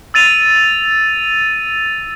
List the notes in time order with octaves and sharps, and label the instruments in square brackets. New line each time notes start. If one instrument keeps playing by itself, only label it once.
[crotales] E6 A6 D#7 F7